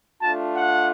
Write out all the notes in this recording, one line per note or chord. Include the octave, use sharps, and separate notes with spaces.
A3 D4 F4 A5
F#5